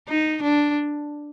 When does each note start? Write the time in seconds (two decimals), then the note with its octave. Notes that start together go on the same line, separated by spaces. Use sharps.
0.08 D#4
0.42 D4